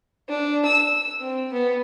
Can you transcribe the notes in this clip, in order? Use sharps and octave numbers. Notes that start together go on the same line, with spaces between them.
D4
E6
C4
B3